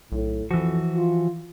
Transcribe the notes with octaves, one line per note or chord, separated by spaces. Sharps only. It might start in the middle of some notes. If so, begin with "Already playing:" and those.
B1 A2
F2 E3 F3 F#4
F4